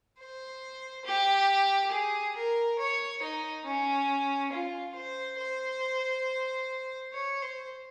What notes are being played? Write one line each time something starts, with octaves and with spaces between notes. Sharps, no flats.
C5
G4
G#4
A#4
C#5
D#4
C#4
F4
C5
C5
C#5
C5